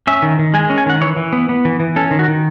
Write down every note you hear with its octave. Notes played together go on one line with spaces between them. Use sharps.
C#4 E5
D#3
D#3
G#3 G#5
C#4
G#5
D#3 F#5
E3 C#5
E3
B3
B3
E3
E3
C#4 A4
D#3
F#4
D#3